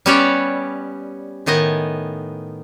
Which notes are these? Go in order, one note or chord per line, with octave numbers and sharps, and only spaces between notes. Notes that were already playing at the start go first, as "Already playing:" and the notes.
G3 B3 C#4 B4 C#5 D5
A2 D#3 B3 D#5 G#5